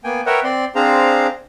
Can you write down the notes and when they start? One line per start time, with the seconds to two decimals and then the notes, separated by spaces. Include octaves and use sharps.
0.04 A#3 B3 G5 G#5
0.26 A#4 B4 C#5 E5 F#5 G5
0.44 C4 D5 C6
0.75 C4 D4 G#4 C5 F5 A#5